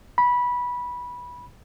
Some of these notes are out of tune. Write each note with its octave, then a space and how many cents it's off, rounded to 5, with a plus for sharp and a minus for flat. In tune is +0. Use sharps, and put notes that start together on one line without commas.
B5 -15